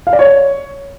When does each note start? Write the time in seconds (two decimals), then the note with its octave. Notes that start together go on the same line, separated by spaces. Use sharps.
0.07 F5
0.13 D5
0.19 C#5